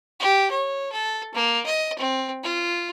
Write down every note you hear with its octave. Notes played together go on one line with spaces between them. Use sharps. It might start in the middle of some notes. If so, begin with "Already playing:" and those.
G4
C#5
A4
A#3
D#5
C4
F4